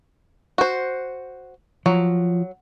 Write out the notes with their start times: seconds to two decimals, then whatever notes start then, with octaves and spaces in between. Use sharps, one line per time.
0.58 F#4 C5
1.86 F3 F#3